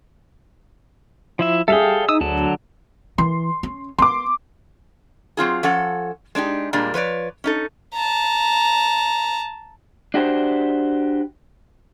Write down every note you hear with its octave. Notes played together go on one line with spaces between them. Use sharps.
F3 E4 E5
G3 G#4 A4 E5 F5 G5
D#4 D#6 E6
D2 D3 F#3 A5
E3 C6
C#4
B3 C6 D6
F#3 C4 F4 G#4
F3 C#4 A4 F#5
G#3 D4 D#4 G4
A#2 G3 G#3 A#3 D4
F3 B4 C#5 D5
C#4 D#4 A4
A5 A#5
D4 F#4 G4 C5